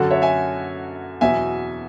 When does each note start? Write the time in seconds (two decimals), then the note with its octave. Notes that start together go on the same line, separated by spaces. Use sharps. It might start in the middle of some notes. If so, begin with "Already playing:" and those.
Already playing: F#2 D3 F#3 F#4 A4
0.11 C#5 E5
0.22 E5 G#5
1.21 E2 B2 F#3 E5 G#5